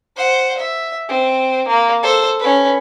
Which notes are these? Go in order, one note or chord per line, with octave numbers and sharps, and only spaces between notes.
C5 F#5
E5
C4
A#3
A4 C5
C#4 B4